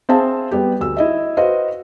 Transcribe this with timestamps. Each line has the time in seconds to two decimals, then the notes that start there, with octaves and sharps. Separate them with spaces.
0.09 C4 G#4 C5 E5 F5 A5
0.51 G3 B3 G4
0.80 D2 E6
0.97 E4 D#5 E5
1.37 F#4 B4 C5 D#5 F5